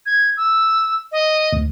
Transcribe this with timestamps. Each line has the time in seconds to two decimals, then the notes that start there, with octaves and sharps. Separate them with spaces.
0.06 G#6
0.37 E6
1.12 D#5
1.53 D2